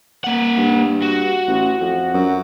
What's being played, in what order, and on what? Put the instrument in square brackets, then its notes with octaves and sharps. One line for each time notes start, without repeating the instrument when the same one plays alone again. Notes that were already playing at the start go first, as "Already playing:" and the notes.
[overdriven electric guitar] A#3 F#5
[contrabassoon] G2
[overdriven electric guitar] F#4
[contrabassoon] A1
F2
F#2